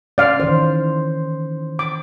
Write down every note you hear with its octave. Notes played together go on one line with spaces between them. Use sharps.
C#4 D5 F5
D#3 E3 C5
D6